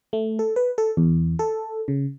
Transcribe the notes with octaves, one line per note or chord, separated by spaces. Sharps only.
A3
A4
B4
A4
E2
A4
C#3